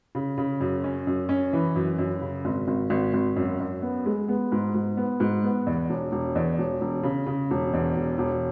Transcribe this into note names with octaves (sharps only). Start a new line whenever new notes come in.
C#3
C#3
F#2
C#4
F#2
C#4
E3
F#2
F#2
C#3
G#1
G#1
G#1
G#1
F#2
F#2
B3
G#3
B3
G#2
G#2
B3
G#2
B3
E2
E1
E1
E2
E1
E1
C#3
C#3
E1
E2
E1
E1